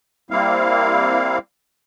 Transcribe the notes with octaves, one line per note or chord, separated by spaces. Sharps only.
G3 A#3 C4 E4 F5